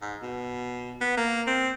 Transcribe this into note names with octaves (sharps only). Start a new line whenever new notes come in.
G#2
B2
B3
A#3
C4